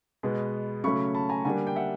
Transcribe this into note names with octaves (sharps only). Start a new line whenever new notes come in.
B2 G#3 B3
C#3 F#3 A3 C#4 B5 C#6
A5 B5
G#5 A#5
D3 G3 A#3 D4 F#5 G#5
G5
E5 F#5